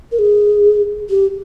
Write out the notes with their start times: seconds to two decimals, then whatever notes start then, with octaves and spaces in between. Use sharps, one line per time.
0.12 A#4
0.19 G#4
1.10 G4